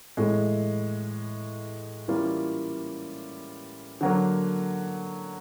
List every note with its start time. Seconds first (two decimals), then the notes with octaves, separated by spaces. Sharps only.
0.17 A2 E3 G#3
2.08 E3 G3 A#3 C#4 F4
4.01 D3 F#3 A#3